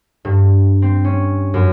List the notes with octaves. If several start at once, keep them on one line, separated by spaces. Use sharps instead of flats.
G2
C4
C#4
F#2